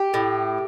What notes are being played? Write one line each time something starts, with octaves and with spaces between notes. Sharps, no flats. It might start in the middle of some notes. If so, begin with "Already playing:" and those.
Already playing: G4
A2